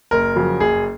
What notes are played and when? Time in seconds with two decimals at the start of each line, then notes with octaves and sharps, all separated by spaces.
0.11 F#1 A#4
0.36 F2 C#3 F#3
0.60 F#1 G#4